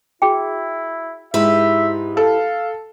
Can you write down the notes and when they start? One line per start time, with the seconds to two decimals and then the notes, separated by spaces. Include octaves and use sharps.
0.22 E4 F#4 G#4 G5
1.34 G#2 E4 G4 B4 E5
2.17 A4 F5